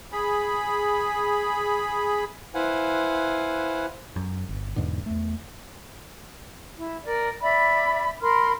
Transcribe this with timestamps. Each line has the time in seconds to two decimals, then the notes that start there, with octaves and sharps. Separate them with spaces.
0.12 G#4 B5
2.54 E4 B4 C5 F5 F#5 G#5
4.16 F#2
4.49 G1
4.76 E2 G#2 B2 D3
5.06 E2 A3
6.77 E4
7.03 A#4 D5
7.41 D5 E5 B5
8.21 A#4 B5 C6 F6